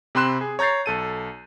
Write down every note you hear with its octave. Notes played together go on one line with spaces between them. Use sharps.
C3 C4 B5 C6 F#6 E7
G#4
C#5 A#5 G6 A6 C7
B1 A4 D#7